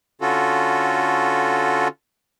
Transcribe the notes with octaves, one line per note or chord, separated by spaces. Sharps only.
D3 C#4 F4 F#4 A4